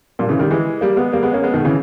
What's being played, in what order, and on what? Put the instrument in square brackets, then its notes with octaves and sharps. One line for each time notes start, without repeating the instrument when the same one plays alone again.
[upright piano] G2 A#2
C#3 E3
D#3 G3
E3 G#3
G3 A#3
G#3 B3
G3 A#3
G#3 B3
A#3 C#4
G#3 B3
B2 D#3
C#3 E3